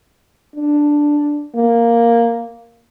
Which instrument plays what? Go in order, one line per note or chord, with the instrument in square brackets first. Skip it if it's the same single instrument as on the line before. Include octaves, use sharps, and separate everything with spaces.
[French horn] D4
A#3